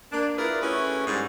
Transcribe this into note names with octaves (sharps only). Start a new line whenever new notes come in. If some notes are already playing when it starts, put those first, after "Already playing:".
A#3 D4
E4 F4 G#4 A#4 B4 D5
A3 C#4 E4 F#4 G#4 B4
G#2 G3